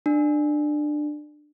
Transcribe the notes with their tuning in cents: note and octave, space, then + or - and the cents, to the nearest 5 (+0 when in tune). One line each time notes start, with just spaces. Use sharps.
D4 +20